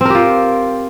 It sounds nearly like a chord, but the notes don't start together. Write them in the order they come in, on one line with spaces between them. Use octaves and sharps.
C4 A#4 G4 F4